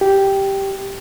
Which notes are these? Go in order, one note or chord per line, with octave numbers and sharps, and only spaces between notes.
G4